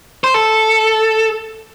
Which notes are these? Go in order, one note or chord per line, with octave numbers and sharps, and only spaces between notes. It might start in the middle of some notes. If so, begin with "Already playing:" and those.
C5
A4